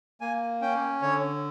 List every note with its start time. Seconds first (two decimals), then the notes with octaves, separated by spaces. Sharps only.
0.21 A#3 G#5
0.62 C#4 G5
1.02 D3 C#5